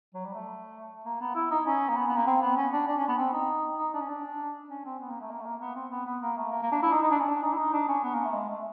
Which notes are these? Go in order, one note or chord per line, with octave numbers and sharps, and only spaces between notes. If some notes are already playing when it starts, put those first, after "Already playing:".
F#3
G3
A3
A#3
B3
E4
D#4
C#4
A#3
B3
B3
A#3
C4
B3
C#4
D4
D4
C#4
B3
C4
D#4
D#4
D4
C#4
D4
C#4
C4
B3
A#3
A3
A#3
A3
A#3
B3
C4
B3
B3
A#3
A3
A#3
A#3
D4
E4
D#4
D#4
D4
C#4
D4
D#4
E4
D#4
D4
C#4
B3
A#3
A3
G#3
A3